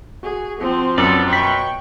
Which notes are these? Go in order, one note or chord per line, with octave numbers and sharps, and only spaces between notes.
F#4 G#4
F3 C4
F#2 B3 A4 D5
B2 G5 B5 C#6